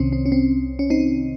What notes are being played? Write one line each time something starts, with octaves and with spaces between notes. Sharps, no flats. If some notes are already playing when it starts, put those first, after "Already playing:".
Already playing: C2 C3 D#3 C4 C#4
C4
C#4
C4
C#4
C4 D#4